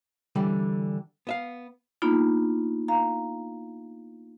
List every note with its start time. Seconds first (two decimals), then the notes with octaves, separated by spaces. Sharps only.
0.36 D3 E3 G3
1.27 B3 E5 F5
2.02 A#3 B3 D4 D#4 F4
2.88 F5 A#5